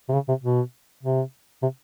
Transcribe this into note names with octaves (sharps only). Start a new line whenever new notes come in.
C3
C#3
C3
B2
C3
C3